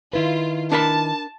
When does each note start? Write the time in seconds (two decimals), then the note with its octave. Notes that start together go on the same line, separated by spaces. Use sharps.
0.13 D#3 E4 F4 B4
0.72 D4 A#4 A5 B5